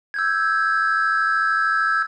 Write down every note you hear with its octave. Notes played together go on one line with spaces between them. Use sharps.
E6 G6 G#6